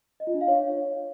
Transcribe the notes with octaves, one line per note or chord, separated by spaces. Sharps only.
D#5
F4
D4
F5
C#5